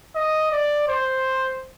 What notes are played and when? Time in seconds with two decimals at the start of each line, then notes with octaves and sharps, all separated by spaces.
0.16 D#5
0.52 D5
0.88 C5